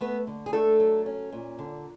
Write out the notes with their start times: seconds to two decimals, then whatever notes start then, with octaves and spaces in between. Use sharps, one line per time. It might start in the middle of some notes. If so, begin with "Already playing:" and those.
0.01 A3 B3 B4
0.27 D3
0.46 G#4
0.53 A3 D4 A4
0.80 F#3
1.06 C#4
1.32 A#2
1.59 D3